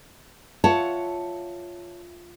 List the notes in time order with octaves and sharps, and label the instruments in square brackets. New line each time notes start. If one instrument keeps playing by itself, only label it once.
[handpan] F4 E5 [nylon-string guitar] C#5 F#5 A5